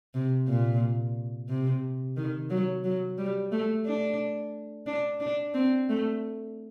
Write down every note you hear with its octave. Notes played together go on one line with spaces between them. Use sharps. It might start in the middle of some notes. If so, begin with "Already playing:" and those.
C3
A#2
C3
D#3
F#3
F#3
G3
A3
D4
D4
D4
C4
A3